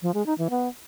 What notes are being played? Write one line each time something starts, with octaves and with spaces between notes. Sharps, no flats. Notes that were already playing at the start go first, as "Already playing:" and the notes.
F3
G#3
D#4
E3
B3